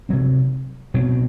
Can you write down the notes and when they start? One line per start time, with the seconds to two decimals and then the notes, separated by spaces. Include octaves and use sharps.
0.09 C3 F#3 C4
0.94 B2 F#3 C4